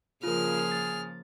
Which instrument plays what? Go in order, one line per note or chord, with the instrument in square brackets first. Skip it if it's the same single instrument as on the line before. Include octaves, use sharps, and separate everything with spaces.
[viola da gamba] C#3 F3 A#3 [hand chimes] F4 A#4 [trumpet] G#4 [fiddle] F6
[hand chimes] A6